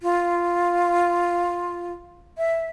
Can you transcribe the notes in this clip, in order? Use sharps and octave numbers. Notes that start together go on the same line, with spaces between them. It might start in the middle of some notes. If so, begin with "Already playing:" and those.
F4
E5